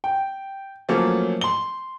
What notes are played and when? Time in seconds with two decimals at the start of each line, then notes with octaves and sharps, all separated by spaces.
0.04 G5
0.89 F3 F#3 A3 A#3 C#4
1.41 C6 G7